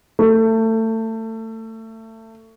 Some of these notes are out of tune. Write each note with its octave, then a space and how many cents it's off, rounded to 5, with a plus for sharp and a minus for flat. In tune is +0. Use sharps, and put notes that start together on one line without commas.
A3 +25